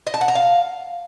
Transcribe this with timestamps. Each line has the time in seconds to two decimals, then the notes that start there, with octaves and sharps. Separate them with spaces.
0.07 D#5
0.14 A5
0.21 F#5
0.28 A#5
0.35 F5